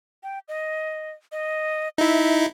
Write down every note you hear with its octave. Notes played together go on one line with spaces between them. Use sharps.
G5
D#5
D#5
D#4 E4 E5